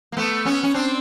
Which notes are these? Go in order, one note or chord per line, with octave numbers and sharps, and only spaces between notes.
A#3
A3 B3
B3 C#4
C#4
C4 D4